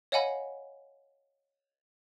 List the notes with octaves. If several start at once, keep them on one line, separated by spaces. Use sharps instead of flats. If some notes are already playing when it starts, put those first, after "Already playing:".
C#5 D#5 F5 F#5 G#5 B5